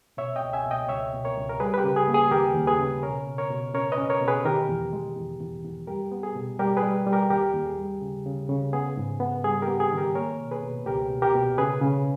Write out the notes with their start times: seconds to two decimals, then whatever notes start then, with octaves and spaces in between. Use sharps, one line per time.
0.17 B2 C#5 E5
0.36 D#5 G5
0.42 C#2
0.53 E5 G#5
0.66 B2
0.71 D#5 G5
0.89 C#2 C#5 E5
1.13 B2
1.25 A#4 C#5
1.37 C#2
1.49 A#4
1.60 G3 G#4 B4
1.74 B4
1.78 G4 A#4
1.84 C#3
1.96 G#4
2.08 A#3
2.14 G#4
2.31 D#2 G4 A#4
2.55 D#2
2.67 G#4 B4
2.79 C#3
3.03 B2 A#4 C#5
3.27 B2
3.38 A#4 C#5
3.50 B2
3.74 C#4 A#4 C#5
3.92 B4 D#5
3.98 C#4
4.10 A#4 C#5
4.22 B2
4.28 G#4 B4
4.45 D#3 G4 A#4
4.69 E2
4.93 G#3
5.16 E2
5.40 E2
5.64 E2
5.87 G3 G4 A#4
6.12 B3
6.23 G#4
6.36 B2
6.59 G3 G4 A#4
6.77 G#4 B4
6.83 G3
7.07 G3
7.13 G4 A#4
7.30 D#2 G4 A#4
7.54 D#2
7.66 G#4
7.78 G3
8.01 C#3
8.26 C#3
8.49 C#3
8.73 B3 G#4
8.97 G#2
9.20 B3
9.44 G3 G#4
9.62 G4 A#4
9.68 B3
9.80 G#4
9.92 D#3
9.98 G4 A#4
10.15 A#3 A#4 C#5
10.40 B2
10.51 G#4 B4
10.63 B2
10.86 C#2 G4 A#4
11.10 B2
11.22 G4 A#4
11.35 B2
11.58 C#3 G#4 B4
11.82 C#3